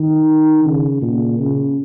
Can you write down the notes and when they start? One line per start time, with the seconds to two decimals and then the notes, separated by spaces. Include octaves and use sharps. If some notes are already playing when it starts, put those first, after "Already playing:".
Already playing: D#3
0.65 C#3
1.01 A#2
1.39 C#3